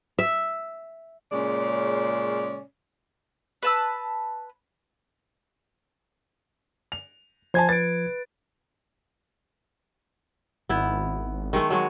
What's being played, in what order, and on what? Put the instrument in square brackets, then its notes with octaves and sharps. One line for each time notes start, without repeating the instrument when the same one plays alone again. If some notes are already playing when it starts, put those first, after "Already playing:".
[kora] E5
[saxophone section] A#2 C#3 G#3 C#4 C#5 D5
[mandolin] B4 A5 E6
[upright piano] F7
[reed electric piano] F3 G#6 [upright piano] C5 G#5 A5
[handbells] B4 D7 [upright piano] A6
[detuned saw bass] G#1 [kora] B3 E4
[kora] D#3 G#3 A3
F#3 G#3